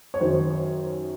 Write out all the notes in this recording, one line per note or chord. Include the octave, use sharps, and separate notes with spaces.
C#5
F#2 D#3 C5
C#5